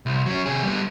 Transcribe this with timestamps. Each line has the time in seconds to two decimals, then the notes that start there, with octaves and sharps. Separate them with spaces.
0.06 C2
0.26 F#3 C#4
0.46 C3 G#4
0.63 G3 B3